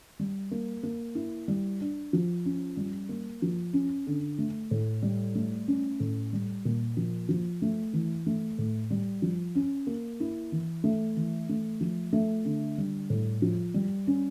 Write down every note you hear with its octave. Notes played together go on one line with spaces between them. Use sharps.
G3
A#3
A#3
E4
G3
D4
F3
C#4
G3
A#3
F3
C#4
D3
A3
A2
G3
A3
C#4
A2
G3
A#2
F3
F3
A3
E3
A3
A2
G3
F3
C#4
A#3
E4
E3
A3
E3
A3
F3
A3
D3
G3
A2
F3
G3
C#4